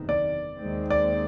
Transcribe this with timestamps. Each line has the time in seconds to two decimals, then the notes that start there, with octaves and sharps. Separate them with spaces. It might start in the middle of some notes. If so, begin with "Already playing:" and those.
Already playing: F#1 E2 C3 D#3
0.09 D5
0.57 D#2 D#3 G#3 C4
0.90 D5